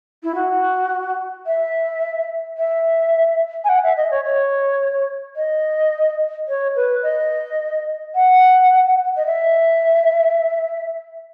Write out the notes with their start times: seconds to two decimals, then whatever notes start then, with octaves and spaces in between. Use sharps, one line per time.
0.23 E4
0.34 F#4
1.46 E5
2.57 E5
3.64 G#5
3.69 F#5
3.83 E5
3.97 D#5
4.11 C#5
4.25 C#5
5.36 D#5
6.48 C#5
6.75 B4
7.03 D#5
8.15 F#5
9.16 D#5
9.26 E5